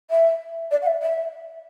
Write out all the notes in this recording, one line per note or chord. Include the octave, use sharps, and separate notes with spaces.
E5
D5
F#5
E5
E5